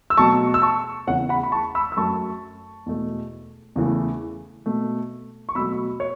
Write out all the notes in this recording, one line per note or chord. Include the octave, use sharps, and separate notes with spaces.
E6
B2 F#3 A3 A5 C#6
E6
A5 C#6
E2 C#3 E3 C#5 F#5
F#5 B5
B5
A5 C#6
B5 E6
E6
F#2 F#3 A3 A5 C#6
E2 B2 A3
E2 C#3 E3 A3
B2 A3
C#6
B2 F#3 A3 B5 E6
C#5